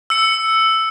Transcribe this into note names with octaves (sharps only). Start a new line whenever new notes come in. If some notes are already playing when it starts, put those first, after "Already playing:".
E6 C#7